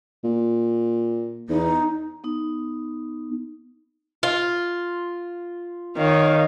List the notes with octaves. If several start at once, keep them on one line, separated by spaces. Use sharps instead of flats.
A#2
E2 D#4
B3 D#4
F4
D#3 C#5 F5